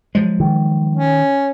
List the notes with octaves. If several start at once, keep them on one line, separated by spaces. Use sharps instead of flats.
F3 F#3 G#3
D#3
C#4